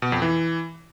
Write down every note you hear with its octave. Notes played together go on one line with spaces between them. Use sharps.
B2
F2
E3